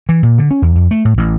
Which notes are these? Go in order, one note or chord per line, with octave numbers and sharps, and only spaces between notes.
E3
A#2
D3
C#4
E2
F2
A3
A2
A1